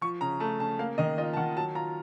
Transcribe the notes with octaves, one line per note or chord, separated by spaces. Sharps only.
F3 C#6
C#3 A#5
A3 A5
C#3 A5
A#3 F5
D#3 D#5
F4 D#5
A5
D#3 F#5
F#3 A5
F4 A#5